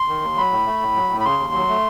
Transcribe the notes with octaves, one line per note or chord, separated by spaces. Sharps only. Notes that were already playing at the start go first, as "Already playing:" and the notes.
Already playing: C6
D#3
D#2
F#3 B5
A2
A3
A2
F#3
A2
B5
C#3 C6
D#2
F#3
A3